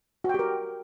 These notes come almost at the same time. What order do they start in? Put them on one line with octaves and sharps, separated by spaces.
F#4 G5 G4 A#4